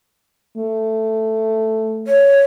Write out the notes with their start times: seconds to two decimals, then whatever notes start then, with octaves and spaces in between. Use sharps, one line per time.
0.57 A3
2.07 C#5